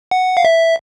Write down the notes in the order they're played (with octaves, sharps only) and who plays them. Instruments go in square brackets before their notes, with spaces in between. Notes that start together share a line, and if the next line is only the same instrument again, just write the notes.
[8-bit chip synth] F#5
F5
E5